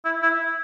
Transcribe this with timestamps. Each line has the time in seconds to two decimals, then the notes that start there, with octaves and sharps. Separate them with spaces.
0.05 E4
0.22 E4